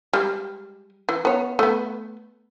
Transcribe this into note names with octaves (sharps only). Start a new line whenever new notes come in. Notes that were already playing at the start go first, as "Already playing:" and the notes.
G3 G#3
E3
B3 C#5
A3 B3